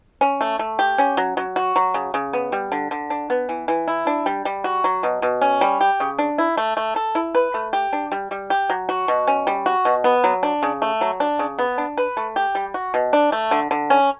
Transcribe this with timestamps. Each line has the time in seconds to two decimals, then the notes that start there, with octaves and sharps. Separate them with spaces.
0.21 C#4
0.41 A3
0.59 A3
0.79 G4
0.98 C#4
1.17 F#3
1.37 F#3
1.56 F#4
1.76 F#3
1.94 C#3
2.14 C#3
2.33 B3
2.52 G3
2.72 D3
2.91 D3
3.10 D4
3.30 B3
3.49 E3
3.68 E3
3.88 E4
4.07 D4
4.26 G3
4.45 G3
4.64 F#4
4.84 F#3
5.03 B2
5.22 B2
5.41 C#4
5.61 G3
5.81 G4
6.00 C#3
6.19 D4
6.38 E4
6.57 A3
6.77 A3
6.96 A4
7.15 E4
7.35 B4
7.54 A3
7.73 G4
7.93 D4
8.12 G3
8.31 G3
8.50 G4
8.70 F#3
8.89 F#4
9.08 B2
9.27 C#4
9.47 G3
9.66 F#4
9.85 B2
10.04 B3
10.24 F#3
10.43 D4
10.63 C#3
10.82 A3
11.01 F#3
11.20 D4
11.39 C#3
11.59 B3
11.78 D4
11.97 B4
12.17 A3
12.36 G4
12.55 G3
12.74 F#4
12.94 B2
13.13 D4
13.32 A3
13.51 D3
13.71 D3
13.90 C#4